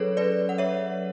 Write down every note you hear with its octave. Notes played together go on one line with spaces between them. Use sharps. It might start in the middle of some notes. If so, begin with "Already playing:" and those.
Already playing: F#3 C#4 G#4 A4 B4 C#5
B4 D5
F#5
C#5 E5